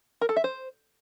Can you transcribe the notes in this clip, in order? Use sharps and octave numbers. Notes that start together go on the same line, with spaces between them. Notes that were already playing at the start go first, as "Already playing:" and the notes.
A#4
A4
E5
C5